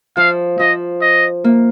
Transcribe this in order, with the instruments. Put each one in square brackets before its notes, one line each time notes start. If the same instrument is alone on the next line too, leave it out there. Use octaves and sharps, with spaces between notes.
[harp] F3 [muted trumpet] F5
[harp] F3 [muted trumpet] D#5
[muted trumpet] D#5
[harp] A#3